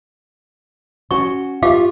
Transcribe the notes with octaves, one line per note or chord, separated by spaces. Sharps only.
C#4 F#4 C#6
F4 G4 F5 D6